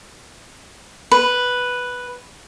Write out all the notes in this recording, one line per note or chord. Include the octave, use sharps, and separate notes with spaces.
B4